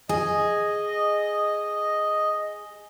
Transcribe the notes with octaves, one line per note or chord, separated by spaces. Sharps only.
G#4 D#5